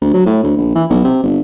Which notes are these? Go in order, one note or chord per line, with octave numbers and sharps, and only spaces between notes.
D2
F#3
A2
D2
A#1
E3
B1
C3
G1